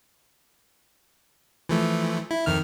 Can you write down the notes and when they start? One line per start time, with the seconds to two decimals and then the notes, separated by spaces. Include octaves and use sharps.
1.69 E3 F3 A3
2.31 E4
2.46 F2 D#3 F6